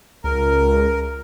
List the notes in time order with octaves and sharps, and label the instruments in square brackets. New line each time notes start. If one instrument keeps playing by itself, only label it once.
[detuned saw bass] C#2 [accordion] A#4